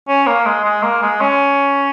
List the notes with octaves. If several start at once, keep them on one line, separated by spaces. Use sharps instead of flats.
C#4
A#3
G#3
G#3
A#3
G#3
C#4